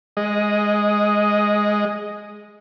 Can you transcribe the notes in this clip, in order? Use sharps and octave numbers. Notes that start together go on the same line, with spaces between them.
G#3 D#5